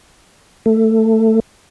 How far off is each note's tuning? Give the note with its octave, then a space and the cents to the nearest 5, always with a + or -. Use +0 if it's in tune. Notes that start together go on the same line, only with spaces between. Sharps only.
A3 +15